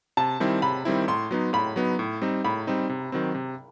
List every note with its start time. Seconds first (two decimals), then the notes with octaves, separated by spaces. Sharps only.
0.17 C3 A5
0.40 D#3 G3 C4 E4
0.62 C3 B5
0.85 D#3 G3 C4 E4
1.08 A2 C6
1.31 F#3 B3 D#4
1.53 A2 B5
1.76 F#3 B3 D#4
1.99 A2
2.22 G3 C4 D#4
2.44 A2 B5
2.67 G3 C4 D#4
2.89 C3
3.12 D#3 F#3 C4
3.35 C3